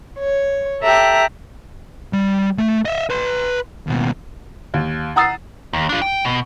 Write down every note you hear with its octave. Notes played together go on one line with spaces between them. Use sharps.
C#5
G4 A4 E5 G5 A#5 F#6
G3
A3
D#5 E5
B4 C6
D#2 B2
D#2
F#5 A#5 D#6 E6 A6 C7
D#2
D4 F4
G5
B2